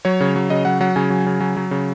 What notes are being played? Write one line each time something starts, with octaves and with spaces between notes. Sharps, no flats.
F#3 C#5
C#3
F#3
C#3 D#5
F#3 F#5
F#3 F#5
C#3 G#5
F#3
C#3
F#3
F#3
C#3